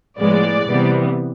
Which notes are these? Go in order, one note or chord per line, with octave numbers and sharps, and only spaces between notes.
A2 F3 G#3 B3 D5
C3 E3 G3 B3